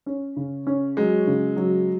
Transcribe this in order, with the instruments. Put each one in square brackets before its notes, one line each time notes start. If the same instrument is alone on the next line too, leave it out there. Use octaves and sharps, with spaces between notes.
[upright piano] C#4
C#3
C#4
[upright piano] F#3 [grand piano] G#3
[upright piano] C#3
F#3